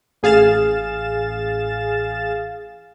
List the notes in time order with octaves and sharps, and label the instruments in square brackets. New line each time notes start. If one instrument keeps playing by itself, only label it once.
[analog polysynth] A1 G#4 F5 A6 E7